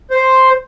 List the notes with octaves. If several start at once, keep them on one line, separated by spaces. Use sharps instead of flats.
C5